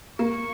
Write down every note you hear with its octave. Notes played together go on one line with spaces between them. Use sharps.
A#3 C#6